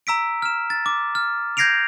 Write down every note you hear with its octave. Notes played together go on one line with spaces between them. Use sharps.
A#5 E6 B6 D7
F6 E7
A6
D6
F6
G6 G#6 A#6 C7 D7 F7